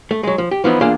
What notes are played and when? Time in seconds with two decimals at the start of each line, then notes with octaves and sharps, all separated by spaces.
0.11 A3
0.23 F#3 G#3
0.38 F3
0.51 G4
0.64 E3 F3 B3 D#4 E4
0.81 E2 A#3 D4 F4 G#4 F5